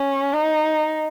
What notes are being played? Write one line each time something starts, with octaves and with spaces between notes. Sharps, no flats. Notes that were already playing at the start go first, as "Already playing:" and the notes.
Already playing: C#4
D#4